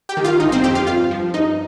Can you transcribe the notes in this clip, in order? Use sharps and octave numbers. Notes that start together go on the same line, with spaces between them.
G4 G5
D#3
F4 F5
G1 D#4 D#5
C4 C5
F2 G4 G5
F4 F5
G2 F4 F5
F3
G2 D#4 D#5